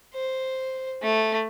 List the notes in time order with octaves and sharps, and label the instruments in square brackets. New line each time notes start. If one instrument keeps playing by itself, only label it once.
[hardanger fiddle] C5
A3